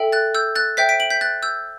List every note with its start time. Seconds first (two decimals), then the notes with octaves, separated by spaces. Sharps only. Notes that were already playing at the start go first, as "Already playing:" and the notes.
Already playing: A4 E5 G5
0.12 F#6 A6
0.35 E6 G6
0.55 F#6 A6
0.77 C5 E5 G5 G6 B6
0.89 B6 D7
1.00 D7 F#7
1.10 G6 B6
1.21 F#6 A6
1.43 E6 G6